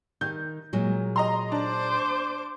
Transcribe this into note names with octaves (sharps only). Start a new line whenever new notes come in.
D#3 G6
A#2 F#3 G#3
D#5 A#5 C6
D4 C5 D6